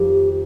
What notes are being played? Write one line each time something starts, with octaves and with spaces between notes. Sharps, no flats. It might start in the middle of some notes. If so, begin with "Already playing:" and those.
Already playing: F2 D#3 G3 G4